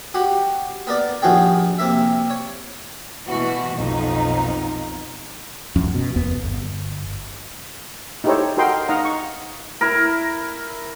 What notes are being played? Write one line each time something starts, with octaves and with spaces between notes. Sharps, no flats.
F#4 G4 F#5
B3 A#4 D5
A#1 D#2 F#4 G#4 G5
C3 A#3 E5
C#5
B2 E3 F#4
B1 F2 B2 D#4
D1 F#2 F3 C#4
B2
F1 D#2 B3
G1
D#4 E4 G4 A4 C5 C#5
F#4 A4 A#4 D#5 G5 C6
D#4 D#5 F5 F#5 A#5
C#6
E4 A#4